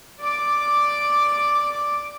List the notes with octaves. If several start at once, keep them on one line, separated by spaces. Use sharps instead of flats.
D5 D6